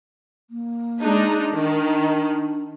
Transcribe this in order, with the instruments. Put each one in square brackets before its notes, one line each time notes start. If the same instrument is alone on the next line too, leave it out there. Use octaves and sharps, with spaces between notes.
[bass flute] A#3
[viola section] G#3 D4 D#4
[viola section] D#3 [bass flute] D4